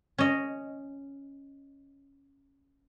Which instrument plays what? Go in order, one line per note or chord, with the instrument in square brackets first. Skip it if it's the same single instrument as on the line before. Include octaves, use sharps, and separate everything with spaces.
[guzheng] C#4 D#5